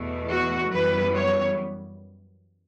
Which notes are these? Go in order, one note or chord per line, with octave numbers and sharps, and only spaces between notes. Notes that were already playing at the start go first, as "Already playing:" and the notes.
Already playing: E2 B2 A3
F#4
F#2 E3 G3 B3 B4
C#5